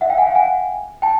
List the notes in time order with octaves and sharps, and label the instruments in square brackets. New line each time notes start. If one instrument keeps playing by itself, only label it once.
[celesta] E5 F#5
F5 G5
F#5 G#5
F5 G5
F#5 G#5
G5 A5